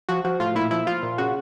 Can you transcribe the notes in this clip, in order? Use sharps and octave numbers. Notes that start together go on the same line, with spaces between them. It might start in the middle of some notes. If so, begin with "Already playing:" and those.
F3 F#4
F3 F#4
A2 F4
A#2 E4
F3 E4
F3 F4
A#2
C#3 F#4